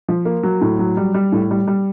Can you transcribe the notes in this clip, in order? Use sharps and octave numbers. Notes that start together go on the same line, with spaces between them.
F3
A#3
F#3
A2
F#3
G3
G3
A2
G3
G3